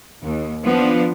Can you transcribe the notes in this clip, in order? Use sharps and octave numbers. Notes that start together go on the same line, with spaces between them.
D#2
F3 B3 D4